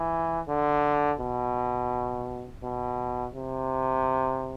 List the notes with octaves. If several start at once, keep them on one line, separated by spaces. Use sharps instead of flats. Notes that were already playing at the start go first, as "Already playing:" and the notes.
Already playing: E3
D3
B2
B2
C3